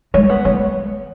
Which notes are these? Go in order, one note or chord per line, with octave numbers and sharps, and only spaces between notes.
G#3 C#5
B3
G#3 C#5